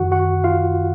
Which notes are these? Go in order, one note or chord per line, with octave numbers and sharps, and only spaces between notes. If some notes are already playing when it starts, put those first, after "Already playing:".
Already playing: F#2 D#3 F#4 F#5
F#4 F#5
F4 F5